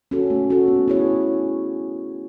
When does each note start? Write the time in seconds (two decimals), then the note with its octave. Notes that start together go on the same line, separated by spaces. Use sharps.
0.11 C#4 F#4 A4
0.30 A3
0.50 C#4 F#4 A4
0.68 B3
0.88 E4 G#4 C#5